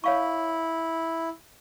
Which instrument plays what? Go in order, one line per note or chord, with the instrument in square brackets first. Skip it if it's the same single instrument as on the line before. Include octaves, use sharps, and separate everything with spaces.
[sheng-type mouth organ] E4 [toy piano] C#5 F5 C#6